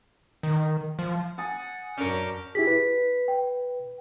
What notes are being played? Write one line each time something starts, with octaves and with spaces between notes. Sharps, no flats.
D#3
F3
F#5 G#5 D#6 A6
F#2 C#4 D4 A#4 D6 F6 G6
E4 G4 G#4 B6
B4
G5